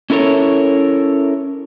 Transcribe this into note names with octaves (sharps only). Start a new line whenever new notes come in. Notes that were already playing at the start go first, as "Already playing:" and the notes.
C#4 E4 A4 A#4 C#5